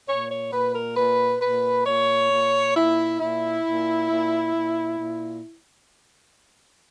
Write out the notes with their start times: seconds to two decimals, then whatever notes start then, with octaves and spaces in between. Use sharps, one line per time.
0.07 A#2 C#5
0.30 C#5
0.51 A#2 B4
0.75 A#4
0.97 A#2 B4
1.41 A#2 B4
1.86 A#2 C#5
2.30 A#2
2.76 A#2 E4
3.20 A#2 E4
3.65 A#2
4.09 A#2
4.54 A#2
4.99 A#2